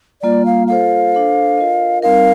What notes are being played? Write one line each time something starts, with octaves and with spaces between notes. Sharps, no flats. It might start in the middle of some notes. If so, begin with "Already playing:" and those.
G3 A#3 F4 D5
F5
F4 A4 C5 F5
D4 A4 C5
F4 A#4 D#5
G3 C4 D#4 A#4 F5